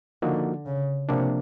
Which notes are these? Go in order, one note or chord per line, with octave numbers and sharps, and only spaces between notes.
D3 F3 A#3 D#4 F#4
C#3
C3 F3 A#3 D4